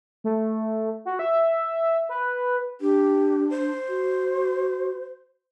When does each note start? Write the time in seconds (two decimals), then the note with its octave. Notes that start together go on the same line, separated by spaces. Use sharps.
0.24 A3
1.05 F#4
1.19 E5
2.09 B4
2.81 D4 G4
3.50 C5
3.89 F#4